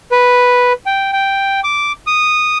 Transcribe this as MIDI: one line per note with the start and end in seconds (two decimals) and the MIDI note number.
0.12 0.73 71
0.86 1.11 79
1.13 1.60 79
1.64 1.92 86
2.07 2.58 87